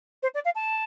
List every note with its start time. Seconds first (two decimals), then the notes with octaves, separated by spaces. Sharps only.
0.22 C5
0.34 D5
0.45 F5
0.55 A5